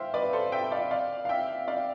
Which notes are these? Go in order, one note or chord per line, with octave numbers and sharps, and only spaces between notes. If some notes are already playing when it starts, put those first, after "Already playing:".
Already playing: C5 E5 F5 G5
B4 D5
A4 C5
E5 G5
D5 F5
D5 F5
F5
E5 G5
D5 F5